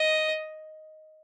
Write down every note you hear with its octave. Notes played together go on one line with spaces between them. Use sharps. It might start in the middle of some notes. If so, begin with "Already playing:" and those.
Already playing: D#5